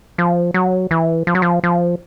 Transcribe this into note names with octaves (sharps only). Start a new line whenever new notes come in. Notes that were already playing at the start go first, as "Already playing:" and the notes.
F3
F#3
E3
F3
F#3
F3
F3